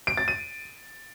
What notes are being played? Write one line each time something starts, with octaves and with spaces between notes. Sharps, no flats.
D7
A6
D#7